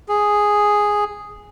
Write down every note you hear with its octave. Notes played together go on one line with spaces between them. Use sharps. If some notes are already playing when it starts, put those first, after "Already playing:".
G#4